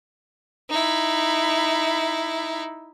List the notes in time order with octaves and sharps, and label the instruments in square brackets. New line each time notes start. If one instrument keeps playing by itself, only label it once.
[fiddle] D#4 E4